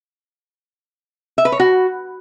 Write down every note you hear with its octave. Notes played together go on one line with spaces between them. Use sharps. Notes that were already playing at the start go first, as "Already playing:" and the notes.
E5
B4
C#5
F#4